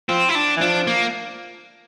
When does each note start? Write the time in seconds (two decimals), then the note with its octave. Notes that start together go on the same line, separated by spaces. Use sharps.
0.09 F3 C4
0.29 E4
0.35 D4
0.57 E3
0.61 F3 D4
0.87 A#3